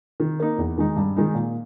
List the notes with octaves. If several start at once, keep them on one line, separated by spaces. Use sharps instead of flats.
D#3
A#3 D#4
E2
D#3 G#3 D#4
G2
D#3 G#3 D#4
A#2